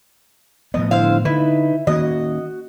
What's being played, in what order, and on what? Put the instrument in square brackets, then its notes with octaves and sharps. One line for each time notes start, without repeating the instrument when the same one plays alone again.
[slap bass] A2 F3 B3 [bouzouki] D#5
[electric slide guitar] D3 E4 [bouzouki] C5 F5
[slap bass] D3 [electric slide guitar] D#4 B4 [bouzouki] E4
[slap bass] D#3 A#3 C#4 [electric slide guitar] F#4 [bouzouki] D#5